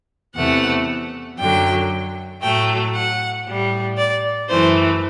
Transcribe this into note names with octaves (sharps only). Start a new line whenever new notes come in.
E2 C3 E3 A3 F#5
F#2 D3 F#3 G5
A2 F#3 A3 G5
F#5
A2 G3
D5
F#2 E3 A3 C5